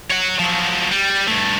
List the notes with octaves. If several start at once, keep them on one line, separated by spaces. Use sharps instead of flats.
C#5 F#5
F3 F#3
G3
G2 A3